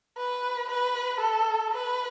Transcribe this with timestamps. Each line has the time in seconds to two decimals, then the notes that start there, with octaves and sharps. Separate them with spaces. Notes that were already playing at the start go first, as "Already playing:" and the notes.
0.17 B4
0.69 B4
1.21 A4
1.73 B4